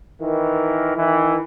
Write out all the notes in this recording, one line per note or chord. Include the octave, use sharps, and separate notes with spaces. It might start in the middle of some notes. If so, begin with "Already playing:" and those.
D#3 E3 A#4
D#3 E3